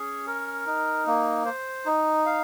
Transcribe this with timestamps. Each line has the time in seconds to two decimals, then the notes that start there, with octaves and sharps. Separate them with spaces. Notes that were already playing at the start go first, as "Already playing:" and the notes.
Already playing: C#4 G#4
0.27 A#4
0.66 D#4
1.07 A#3
1.45 C5
1.86 D#4
2.26 F5